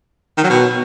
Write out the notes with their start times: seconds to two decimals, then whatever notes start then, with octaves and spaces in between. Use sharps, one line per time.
0.38 D#3
0.44 F#3
0.50 B2